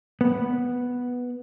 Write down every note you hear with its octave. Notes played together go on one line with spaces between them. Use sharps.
B3